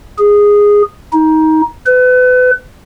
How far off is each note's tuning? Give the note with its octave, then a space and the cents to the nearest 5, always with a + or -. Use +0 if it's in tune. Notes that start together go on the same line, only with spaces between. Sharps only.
G#4 -10
D#4 +20
B4 +35